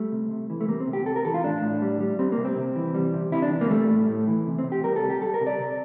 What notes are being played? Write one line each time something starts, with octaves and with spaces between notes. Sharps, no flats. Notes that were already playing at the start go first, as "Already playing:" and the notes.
Already playing: G3 A3
C3
C3
E3
A3
G3 A#3
C4
C3
G4
C3 A4
A#4
E3 A4
F4
A2 D4
A2
G3
G3
G3 C4
A#3
C3
C4
C3
E3
G3
C3
C3 E4
D4
E3
A#3
G3 A3
A2
A2
E3
C3
C4
C3
G4
G3 A#4
A4
G3
G4
G3 A4
A#4
C3
D5
C3